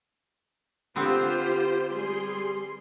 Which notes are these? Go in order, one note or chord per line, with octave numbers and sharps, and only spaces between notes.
D3 B3 C4 F4 G4 C5
G3 G#4 C6